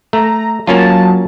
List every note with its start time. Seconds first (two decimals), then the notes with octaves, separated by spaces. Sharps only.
0.13 A3 A#5
0.67 F#3 A#3 C#4 F4 A5